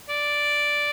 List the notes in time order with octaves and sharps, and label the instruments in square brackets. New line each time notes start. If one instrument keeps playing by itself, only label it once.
[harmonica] D5